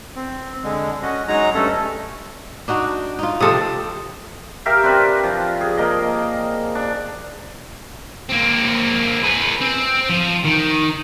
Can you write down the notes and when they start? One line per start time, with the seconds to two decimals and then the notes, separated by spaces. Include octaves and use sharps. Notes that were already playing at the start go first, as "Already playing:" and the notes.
0.16 C4
0.64 D3 G#3
1.02 C#4 F#4 D#5
1.28 F#3 G#3 D#4 A#5
1.55 G2 A3 C#4 A4
2.68 D4 D#4 F#4
3.19 D#4 F4
3.40 C3 F3 C4 A4 D#6
4.66 G4 A#4 E5 F5
4.83 C4 D4 B4
5.23 F3
5.61 G#4
5.77 A#3 D#5
6.75 D4
8.29 A#3 C4
9.24 G#4 B4
9.61 C4
10.09 F3
10.45 D#3